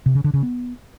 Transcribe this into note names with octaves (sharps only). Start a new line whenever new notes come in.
C3
C#3
D3
C#3
B3